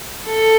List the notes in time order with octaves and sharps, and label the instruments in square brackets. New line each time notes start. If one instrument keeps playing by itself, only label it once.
[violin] A4